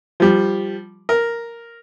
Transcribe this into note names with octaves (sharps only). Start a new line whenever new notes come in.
F3 G3
A#4